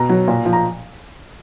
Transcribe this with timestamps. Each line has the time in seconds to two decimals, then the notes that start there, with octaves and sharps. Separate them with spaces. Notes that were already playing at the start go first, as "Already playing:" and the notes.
Already playing: B2 A#5
0.09 F#3
0.28 A#2
0.45 F3
0.53 A#5